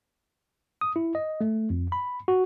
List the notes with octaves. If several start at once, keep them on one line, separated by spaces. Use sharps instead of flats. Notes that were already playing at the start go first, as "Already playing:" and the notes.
D#6
E4
D#5
A3
F2
B5
F#4